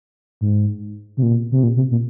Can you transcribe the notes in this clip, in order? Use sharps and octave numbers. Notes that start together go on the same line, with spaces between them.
G#2
C3
A#2
C3
A#2
C3
A#2